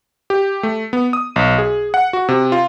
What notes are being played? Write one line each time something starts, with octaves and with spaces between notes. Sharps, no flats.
G4
A3
B3
D#6
B1
G#4
F#5
F#4
C3
F4